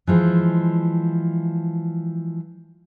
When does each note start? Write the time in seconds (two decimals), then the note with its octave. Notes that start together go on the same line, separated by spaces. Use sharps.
0.07 E3 F3 G#3